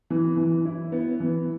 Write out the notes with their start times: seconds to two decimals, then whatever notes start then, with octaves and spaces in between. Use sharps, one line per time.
0.10 E3
0.37 E3
0.65 E4
0.92 B3
1.20 E3